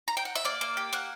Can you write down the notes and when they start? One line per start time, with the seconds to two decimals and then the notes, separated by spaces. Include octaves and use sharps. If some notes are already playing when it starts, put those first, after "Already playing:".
0.08 A#5
0.17 G5
0.25 F#5
0.35 E5
0.45 A#3 D5
0.61 A#3
0.77 G4
0.93 A#3 F#5